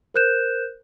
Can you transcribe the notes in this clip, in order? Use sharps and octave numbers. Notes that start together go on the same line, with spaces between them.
A#4 C5 F#6 G6 E7